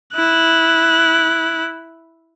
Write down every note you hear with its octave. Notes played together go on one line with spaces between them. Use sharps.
E4 F#6